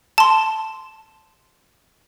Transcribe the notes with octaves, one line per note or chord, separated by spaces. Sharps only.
A5 C6